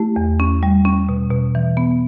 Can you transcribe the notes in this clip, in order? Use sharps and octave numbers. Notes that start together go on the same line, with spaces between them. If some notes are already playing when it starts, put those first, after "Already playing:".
Already playing: A3 E4 G4
E2
C#4
G3
C#4
B2
B2
E3
B3